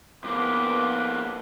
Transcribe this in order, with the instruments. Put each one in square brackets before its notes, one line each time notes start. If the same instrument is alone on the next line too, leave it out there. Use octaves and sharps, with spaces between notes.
[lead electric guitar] F2 A#3 [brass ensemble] B3 B4 [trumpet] D6